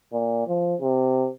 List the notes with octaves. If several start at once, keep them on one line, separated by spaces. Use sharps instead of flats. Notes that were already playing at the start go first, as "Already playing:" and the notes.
A#2
F3
C3